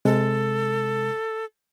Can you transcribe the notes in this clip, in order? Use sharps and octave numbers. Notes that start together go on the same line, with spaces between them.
C3 G#3 A4